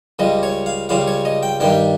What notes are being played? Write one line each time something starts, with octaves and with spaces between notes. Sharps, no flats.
C#2 C#3 G3 D#5
C#5
F5
C#2 C#3 G3 F5
C#5
D#5
G5
G2 D#3 G3 G5